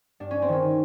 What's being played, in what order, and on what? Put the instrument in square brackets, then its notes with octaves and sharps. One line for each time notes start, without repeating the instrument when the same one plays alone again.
[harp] G2 D4
C#4
C4
D#3 C#4